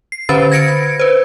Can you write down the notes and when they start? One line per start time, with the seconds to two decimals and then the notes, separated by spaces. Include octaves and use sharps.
0.12 C7
0.29 D3 C#4 B4 C5 B5 A6
0.52 G#6 A#6 C#7 D7
1.00 B4 C5